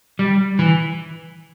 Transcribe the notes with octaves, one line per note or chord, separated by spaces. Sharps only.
G3
E3